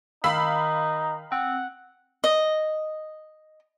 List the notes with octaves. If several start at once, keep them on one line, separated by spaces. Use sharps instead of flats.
D#3 D#4 F5 B5 E6
C4 F#5
D#5